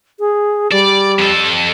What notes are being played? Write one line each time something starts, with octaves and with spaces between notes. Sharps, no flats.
G#4
G3 D5
F2 A4